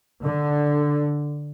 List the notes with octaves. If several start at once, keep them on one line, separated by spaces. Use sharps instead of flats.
D3